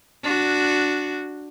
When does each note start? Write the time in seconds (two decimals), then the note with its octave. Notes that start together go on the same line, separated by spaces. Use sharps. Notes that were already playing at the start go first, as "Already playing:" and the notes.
0.23 D4 F#4